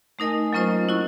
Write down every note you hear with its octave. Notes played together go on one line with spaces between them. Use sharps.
A3 D#4 A#4 D#5 G#5
F#3 A#3 C#4 F4 C5 D#5
E4 F#4 C#6